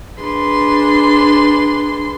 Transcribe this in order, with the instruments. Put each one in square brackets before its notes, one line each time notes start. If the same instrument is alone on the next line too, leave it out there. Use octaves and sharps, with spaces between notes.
[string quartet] D4 G#4 B4 C6